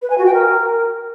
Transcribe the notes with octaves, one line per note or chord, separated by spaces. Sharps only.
B4
G#5
F#4
G5
A#4